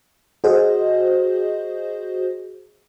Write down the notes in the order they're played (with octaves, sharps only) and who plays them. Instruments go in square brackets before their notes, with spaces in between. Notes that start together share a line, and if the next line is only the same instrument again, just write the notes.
[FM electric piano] F#4 G#4 C5 D#5